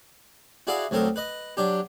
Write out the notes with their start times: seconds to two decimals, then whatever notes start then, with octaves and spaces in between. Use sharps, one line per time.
0.67 E4 F#4 G#4 D5 F5 D#6
0.91 D2 F#3 C4 A4 A#4 D#6
1.16 B4 D#5
1.57 F#3 D4 G4